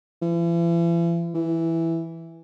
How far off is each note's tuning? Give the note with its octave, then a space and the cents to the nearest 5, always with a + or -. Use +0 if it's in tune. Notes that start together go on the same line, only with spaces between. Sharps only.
E3 +40
E3 +0